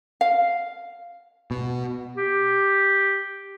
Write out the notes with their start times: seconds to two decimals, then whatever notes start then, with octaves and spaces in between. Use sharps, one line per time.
0.21 F5
1.51 B2
2.16 G4